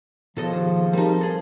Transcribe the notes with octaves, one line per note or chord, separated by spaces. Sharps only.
B2 F3 G#4 A4 D#5
D#2
G3 C4 D#4 A#4 A5
G#4 A4